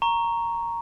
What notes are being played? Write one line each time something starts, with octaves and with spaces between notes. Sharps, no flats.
A#5 C#6